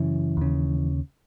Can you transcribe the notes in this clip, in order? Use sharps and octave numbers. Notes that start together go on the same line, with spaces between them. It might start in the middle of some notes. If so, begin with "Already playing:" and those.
Already playing: F#2 C#3 E3
D#2 C#3